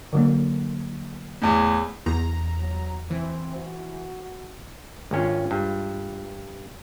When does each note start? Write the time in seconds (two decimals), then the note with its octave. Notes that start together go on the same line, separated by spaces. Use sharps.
0.13 D3 F#3 A#3
1.42 E2 A2
2.06 E2 A#5
2.59 F#3
3.10 E3 C4
3.56 F#4
5.11 G#1 G#3 C#4 D4 F4
5.51 G2